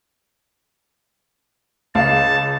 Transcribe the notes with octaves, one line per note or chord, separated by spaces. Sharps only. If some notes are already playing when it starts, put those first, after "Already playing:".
C#2 F5 A5